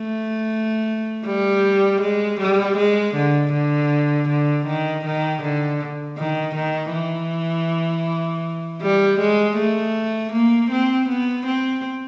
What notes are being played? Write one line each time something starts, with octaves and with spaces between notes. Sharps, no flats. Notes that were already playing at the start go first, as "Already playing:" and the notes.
Already playing: A3
G3
G#3
G3
G#3
D3
D3
D3
D#3
D#3
D3
D#3
D#3
E3
G3
G#3
A3
A#3
C4
B3
C4